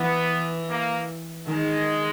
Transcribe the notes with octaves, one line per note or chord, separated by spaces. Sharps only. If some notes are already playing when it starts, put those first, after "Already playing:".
Already playing: E3 B3
A#3
D#3 G#3